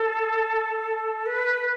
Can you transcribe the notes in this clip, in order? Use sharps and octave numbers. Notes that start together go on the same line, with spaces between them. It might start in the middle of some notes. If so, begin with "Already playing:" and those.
Already playing: A4
B4